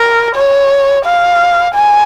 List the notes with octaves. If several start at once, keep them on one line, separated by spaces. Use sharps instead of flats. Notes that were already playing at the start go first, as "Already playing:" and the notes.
Already playing: A#4
C#5
F5
G#5